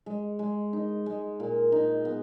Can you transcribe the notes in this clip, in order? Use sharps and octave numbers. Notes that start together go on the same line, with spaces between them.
G#3
G#3
D#4
G#3
A#2
D#4
B3